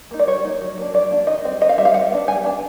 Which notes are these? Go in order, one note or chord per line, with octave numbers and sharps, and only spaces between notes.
A#3 D#4
D5
G3 C#5
A#3 D#4
F#3
A#3 D4
F#3 D5
A#3 D4
D#3 D#5
G3 C4
D#3 D#5
F5
G3 C4 E5
F5
G3 F#5
B3 D4
G3 G#5
B3 D4